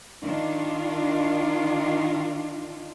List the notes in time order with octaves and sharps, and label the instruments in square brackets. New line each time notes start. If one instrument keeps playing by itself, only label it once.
[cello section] D#3 D4 F4